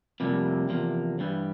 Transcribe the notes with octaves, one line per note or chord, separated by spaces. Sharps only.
F2 C3 G3 A#3
E2 C3 F3 A#3
G2 E3 G3